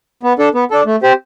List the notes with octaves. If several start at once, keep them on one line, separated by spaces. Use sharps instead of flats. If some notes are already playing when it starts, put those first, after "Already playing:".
B3
D4 A4
B3
D4 A4
A3
C4 G4 C5